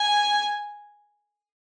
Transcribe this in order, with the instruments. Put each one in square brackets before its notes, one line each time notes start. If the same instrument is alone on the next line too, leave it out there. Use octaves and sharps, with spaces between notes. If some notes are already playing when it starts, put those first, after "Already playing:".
Already playing: [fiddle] G#5